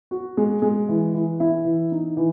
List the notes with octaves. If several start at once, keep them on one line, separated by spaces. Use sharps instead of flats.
F#4
G#3
G#3
E3
E3
E4
E3
D#4
E3